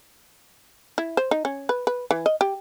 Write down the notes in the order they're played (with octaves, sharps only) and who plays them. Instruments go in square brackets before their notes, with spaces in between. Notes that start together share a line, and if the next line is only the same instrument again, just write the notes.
[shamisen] E4
C5
D#4
C#4
B4
B4
E3
D#5
G4